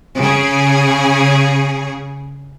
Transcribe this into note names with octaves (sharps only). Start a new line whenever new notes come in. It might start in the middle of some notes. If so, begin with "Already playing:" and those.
C#3 G#4